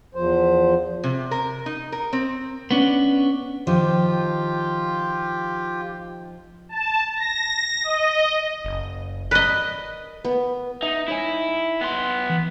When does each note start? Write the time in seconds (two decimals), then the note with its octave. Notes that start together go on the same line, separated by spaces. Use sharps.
0.15 E2 F3 C5
1.03 C3
1.31 A#4
1.66 D#4
1.92 A#4
2.13 C4
2.71 B3 C#4 D4
3.67 D#3 F3 F4 G4
6.69 A5
7.16 A#6
7.84 D#5
8.65 F#1
9.31 A#4 B4 D5 D#5
10.25 B3
10.83 D#4 E5
11.08 D#4 E4 C#5 G#5
11.81 B3 C6
12.30 E3